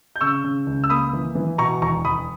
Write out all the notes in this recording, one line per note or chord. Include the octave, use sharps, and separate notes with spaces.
G6
C#3 C#6 E6
C#3
C#2
E6
A#3 B5 D#6
E3
E3
B2 A#5 C#6
E1 A#5 C#6
E1 B5 D#6